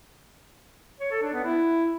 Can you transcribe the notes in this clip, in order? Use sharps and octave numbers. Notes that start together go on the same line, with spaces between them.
C#5
A4
D4
B3
E4